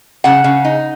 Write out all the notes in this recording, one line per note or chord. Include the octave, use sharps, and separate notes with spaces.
C#3 F#5
C#3
D#4